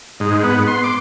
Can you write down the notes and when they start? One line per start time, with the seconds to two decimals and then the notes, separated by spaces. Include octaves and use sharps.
0.20 G#2
0.44 B3
0.68 C6
0.84 D6